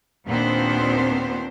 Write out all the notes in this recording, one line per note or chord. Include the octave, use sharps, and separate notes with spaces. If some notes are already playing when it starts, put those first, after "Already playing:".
D#2 A#2 B3 C4 D4 C5